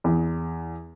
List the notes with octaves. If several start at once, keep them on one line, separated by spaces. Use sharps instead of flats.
E2